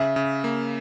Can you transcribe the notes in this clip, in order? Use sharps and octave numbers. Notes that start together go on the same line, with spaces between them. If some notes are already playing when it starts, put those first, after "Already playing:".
Already playing: C#3 E5
C#3
A#3